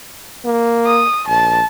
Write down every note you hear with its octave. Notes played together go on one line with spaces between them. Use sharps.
A#3
D#6
A#1 A5